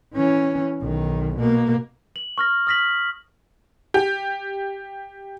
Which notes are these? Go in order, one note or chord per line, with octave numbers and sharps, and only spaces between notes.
E3 C#4
B1 D#3
B2 A#3
F#7
C#6 F6 A#6
D#6 F6 A#6 B6 F#7
G4